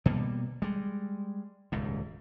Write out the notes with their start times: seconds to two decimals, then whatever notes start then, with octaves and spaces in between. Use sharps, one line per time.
0.06 B2 G3 A#3
0.62 G3 G#3
1.72 D#1 C#2 G#2